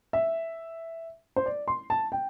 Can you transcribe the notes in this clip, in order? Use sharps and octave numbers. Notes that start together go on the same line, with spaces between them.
E5
C5
D5
C6
A5
G5